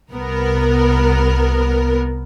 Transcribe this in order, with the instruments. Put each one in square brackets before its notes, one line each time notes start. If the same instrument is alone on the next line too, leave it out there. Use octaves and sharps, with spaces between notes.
[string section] C2 B3 A#4